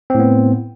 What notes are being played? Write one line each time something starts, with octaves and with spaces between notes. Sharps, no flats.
A2 B3 C4